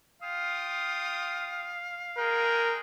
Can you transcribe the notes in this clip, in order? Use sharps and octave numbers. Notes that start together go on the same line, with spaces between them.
F4 F5 G5 D#6
G#3 G#4 A#4 G5